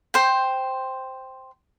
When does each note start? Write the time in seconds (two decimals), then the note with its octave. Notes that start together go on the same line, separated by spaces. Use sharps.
0.14 C5 G5